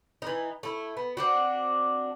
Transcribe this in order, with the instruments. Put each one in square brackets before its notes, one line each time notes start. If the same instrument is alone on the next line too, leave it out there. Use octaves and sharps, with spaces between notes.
[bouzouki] E3 D#4
A3 E4
B3
C4 D4 F#4